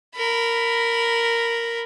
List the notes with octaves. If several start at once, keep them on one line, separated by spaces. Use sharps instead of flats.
A#4 B5